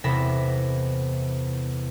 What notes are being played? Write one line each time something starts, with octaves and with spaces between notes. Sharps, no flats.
E2 C3 A4 E5 B5 A#6